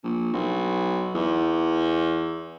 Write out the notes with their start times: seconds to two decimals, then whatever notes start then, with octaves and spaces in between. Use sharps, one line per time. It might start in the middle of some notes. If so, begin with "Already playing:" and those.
0.03 A#1
0.33 B1
1.14 E2